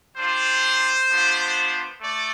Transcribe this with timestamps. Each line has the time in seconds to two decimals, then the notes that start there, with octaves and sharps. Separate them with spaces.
0.17 G3 D4 F4 C5
1.10 B3 D4 F4
2.02 A3 D5